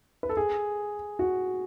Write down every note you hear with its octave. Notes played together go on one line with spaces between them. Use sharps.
B4
A4
G#4
F#4